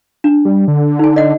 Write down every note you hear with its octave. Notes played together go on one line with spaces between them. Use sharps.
D4
G3
D3
D#4 G#5
D5 D#5 F#5